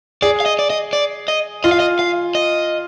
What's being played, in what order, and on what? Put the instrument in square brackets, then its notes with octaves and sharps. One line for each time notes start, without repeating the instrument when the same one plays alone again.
[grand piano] G#4 [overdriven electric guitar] D5
[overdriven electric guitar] F5
D#5
D5
D#5
D5
D#5
[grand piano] F4 [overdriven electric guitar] D#5
[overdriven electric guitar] F5
D#5
F5
D#5